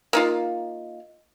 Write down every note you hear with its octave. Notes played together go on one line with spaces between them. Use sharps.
A#3 D#4 F4